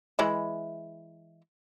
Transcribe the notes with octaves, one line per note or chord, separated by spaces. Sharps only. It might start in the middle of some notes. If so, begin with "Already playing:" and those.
E3 G#3 E4